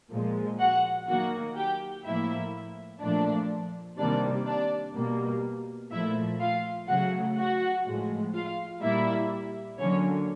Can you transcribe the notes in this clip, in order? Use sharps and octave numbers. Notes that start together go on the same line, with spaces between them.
A#2 F3 G#3
F#4 F#5
D#3 F#3 A#3 F#4 F#5
G4 G5
A2 F3 A#3 E4 E5
A#2 F3 A3 D4 D5
C3 D#3 G3 A#3 D4 D5
D4 D5
B2 G3 A#3
A#2 F3 A3 E4 E5
F4 F5
C#3 F#3 A3 F#4 F#5
F#4 F#5
A2 F3 G#3
F4 F5
A#2 G3 A#3 E4 E5
D3 F#3 A#3 C#4 C#5